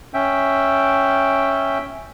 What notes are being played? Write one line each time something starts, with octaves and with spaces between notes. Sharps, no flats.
C#4 E5 G5